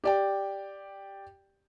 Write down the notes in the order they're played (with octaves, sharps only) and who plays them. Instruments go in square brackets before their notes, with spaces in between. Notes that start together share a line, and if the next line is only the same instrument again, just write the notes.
[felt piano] G4 D5 G5